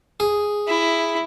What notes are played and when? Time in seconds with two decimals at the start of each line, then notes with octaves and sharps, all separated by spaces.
0.20 G#4
0.67 E4